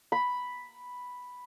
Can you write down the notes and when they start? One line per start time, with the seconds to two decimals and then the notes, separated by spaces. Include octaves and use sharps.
0.12 B5